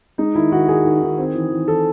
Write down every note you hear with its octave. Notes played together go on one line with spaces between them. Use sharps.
G#3 D#4
D#3 E4
D#3 F#4
D#3 G#4
D#3
D#3
C4
E3
E3
E3 A4